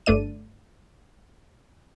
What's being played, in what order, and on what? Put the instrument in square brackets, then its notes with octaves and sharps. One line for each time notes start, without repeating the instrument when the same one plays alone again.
[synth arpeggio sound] G1 A3 D4 D5 D#7